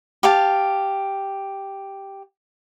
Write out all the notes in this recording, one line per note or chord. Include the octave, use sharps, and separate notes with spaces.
G4 F5 A5